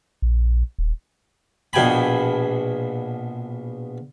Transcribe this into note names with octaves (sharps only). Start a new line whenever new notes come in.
A#1
D#1
A#1 B2 G5 G#5 B5